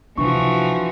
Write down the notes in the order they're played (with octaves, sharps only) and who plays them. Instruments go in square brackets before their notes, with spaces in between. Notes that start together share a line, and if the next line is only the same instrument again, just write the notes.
[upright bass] C3 B3 [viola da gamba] E3 F3 F#4 [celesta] D4 C#6